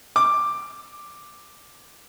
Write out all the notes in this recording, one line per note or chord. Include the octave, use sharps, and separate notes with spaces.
D6